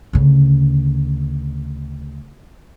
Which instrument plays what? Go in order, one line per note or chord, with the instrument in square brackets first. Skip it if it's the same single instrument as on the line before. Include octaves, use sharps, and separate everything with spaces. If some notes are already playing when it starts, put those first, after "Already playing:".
[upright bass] D2 C#3